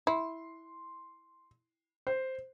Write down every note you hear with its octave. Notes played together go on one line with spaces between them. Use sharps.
E4 C6
C5